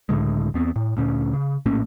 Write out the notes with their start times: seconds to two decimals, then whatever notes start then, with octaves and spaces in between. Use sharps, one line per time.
0.09 C#2 A2 D3 G#3
0.54 E2 B3 C4
0.76 A2
0.97 D2 A#2 C#4
1.33 C#3
1.66 A#1 A2 A#3 C#4